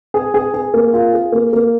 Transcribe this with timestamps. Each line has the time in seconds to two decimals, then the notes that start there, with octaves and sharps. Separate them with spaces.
0.14 G#4
0.34 G#4
0.54 G#4
0.74 A#3
0.93 F4
1.13 G#4
1.32 A#3
1.53 A#3